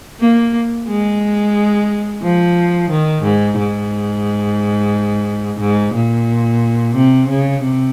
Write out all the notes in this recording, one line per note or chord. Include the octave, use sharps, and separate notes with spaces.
A#3
G#3
F3
D#3
G#2
G#2
G#2
A#2
C3
C#3
C3